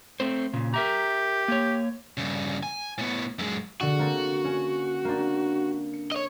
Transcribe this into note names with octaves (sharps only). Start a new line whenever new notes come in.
A3 C4 C5
A#2 C#3
G4 A#4 E5 A#5
A#3 C#5
G2 C#3
G#5
A2 B3
F#2 G#3
D3 D4 F#4
A#3 C4 A4
C#4
A#3 C4 D4
C#7
C#5 D#5